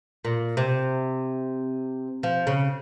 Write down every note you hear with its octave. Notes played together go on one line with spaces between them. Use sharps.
A#2
C3
F3
C#3